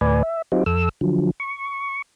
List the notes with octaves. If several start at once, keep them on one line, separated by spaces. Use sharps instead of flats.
D2 A2 B4 D5 G#5
E5
F#3 C4 D#4 F4 G4
F2 A4 E6
D3 F3 F#3
C#6